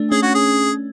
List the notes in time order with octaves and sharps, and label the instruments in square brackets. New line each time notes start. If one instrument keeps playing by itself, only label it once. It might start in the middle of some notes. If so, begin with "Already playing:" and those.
Already playing: [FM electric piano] A3 D4
[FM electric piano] C#4 [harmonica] G#4
[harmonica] F#4
G#4